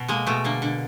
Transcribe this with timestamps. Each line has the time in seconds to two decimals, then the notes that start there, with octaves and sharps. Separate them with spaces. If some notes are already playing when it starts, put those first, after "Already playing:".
Already playing: B2
0.08 G#3 A#3
0.27 B2 A3
0.44 D3 A#3
0.62 D3